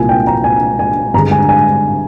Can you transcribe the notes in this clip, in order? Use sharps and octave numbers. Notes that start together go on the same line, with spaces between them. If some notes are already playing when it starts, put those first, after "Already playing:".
Already playing: C2 A#2 F3 A#3 G#5
G5
A#5
G#5
G#5
G2 D3 G#3 A#5
G#5
G#5